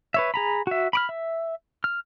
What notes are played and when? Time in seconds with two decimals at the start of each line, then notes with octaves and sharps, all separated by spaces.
0.14 B4 C#5 E5
0.34 G#4 A#5 B5
0.67 F#4 E5
0.93 B5 D6 F6
1.09 E5
1.84 F6